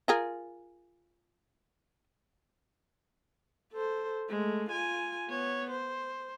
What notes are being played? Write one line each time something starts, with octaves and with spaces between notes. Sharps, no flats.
F4 G#4 A#4
A4 C5
G#3 A3
F4 G#5
B3 C#5
C5